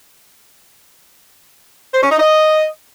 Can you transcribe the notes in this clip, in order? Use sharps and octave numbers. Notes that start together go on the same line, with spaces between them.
C5
C#4
D#4
D#5